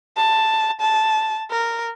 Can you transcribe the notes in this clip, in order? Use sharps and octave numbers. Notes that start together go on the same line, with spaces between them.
A5
A5
A#4